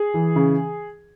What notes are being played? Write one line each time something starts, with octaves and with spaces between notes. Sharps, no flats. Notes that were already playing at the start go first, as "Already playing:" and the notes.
Already playing: G#4
E3
C#3